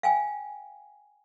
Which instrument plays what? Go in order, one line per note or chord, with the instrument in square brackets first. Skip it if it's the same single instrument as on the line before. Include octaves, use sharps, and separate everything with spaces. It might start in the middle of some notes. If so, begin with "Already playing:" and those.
[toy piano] F5 G5 G#5